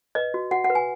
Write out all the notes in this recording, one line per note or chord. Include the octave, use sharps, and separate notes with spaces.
B4 D#5
F#4
F#4 F#5
F#5
B4
G#5